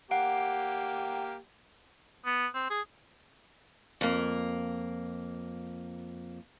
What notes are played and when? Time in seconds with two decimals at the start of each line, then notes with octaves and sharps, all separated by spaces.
0.11 A#3 G4 F#5 D7
2.25 B3
2.54 C4
2.70 G#4
4.01 F2 A#3